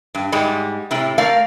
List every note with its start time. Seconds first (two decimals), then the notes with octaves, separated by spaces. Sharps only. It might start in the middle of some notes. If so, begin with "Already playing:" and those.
0.15 G2
0.32 G#2 G3 G#3
0.91 A2 C3
1.18 A3 A#4 D5 F5